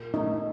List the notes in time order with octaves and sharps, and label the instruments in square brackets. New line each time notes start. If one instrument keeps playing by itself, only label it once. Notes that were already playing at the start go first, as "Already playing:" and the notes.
Already playing: [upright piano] A#2
[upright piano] A3 [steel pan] D#4